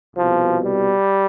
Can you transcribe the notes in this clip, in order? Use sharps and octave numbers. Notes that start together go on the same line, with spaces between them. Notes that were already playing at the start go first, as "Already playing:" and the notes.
C2 B2 F3
G3